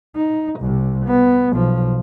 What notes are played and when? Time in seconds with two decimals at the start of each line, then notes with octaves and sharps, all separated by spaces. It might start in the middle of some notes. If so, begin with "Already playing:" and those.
0.15 D#4
0.60 C2 C3
1.05 B3
1.51 B1 F3